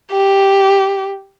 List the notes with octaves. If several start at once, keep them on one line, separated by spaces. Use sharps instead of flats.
G4